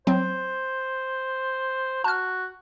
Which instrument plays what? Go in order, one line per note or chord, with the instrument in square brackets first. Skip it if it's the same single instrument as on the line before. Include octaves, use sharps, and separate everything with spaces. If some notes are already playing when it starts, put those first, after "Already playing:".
[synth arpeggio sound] F#3 C4 [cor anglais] C5
[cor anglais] F#4 [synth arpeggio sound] A5 F6